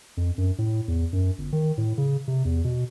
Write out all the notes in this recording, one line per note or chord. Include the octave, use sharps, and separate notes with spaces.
F2
F#2
A2
E2
F#2
G1
D#3
A2
C#3
C3
E2
B2